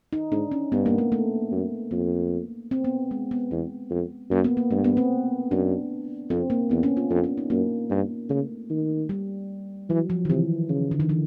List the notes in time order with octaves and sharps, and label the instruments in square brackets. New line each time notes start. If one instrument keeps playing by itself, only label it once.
[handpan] D#4
[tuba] G#2 [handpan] D4
[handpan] C#4
[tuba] G2 [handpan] B3
[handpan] A#3
A3
A3
[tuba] F#2
[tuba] F2 [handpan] A#3
[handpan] C4
B3
G#3
B3
[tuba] E2 [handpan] B3
[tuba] F2
[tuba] F#2 [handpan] A#3
[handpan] B3
A#3
[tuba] G2 [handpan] A3
[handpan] B3
C4
[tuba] F#2 [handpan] D4
[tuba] F2 [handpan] C4
[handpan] A#3
[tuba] E2 [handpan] B3
[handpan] C#4
F4
[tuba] F2 [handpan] D4
[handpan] C#4
D#4
[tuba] F#2 [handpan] A#3
[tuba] G2
[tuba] C#3 [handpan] A3
[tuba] D#3
[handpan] G3
[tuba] E3 [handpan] F#3
[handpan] F3
D#3
[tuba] C3 [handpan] E3
[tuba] C#3
[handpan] D3
D#3
E3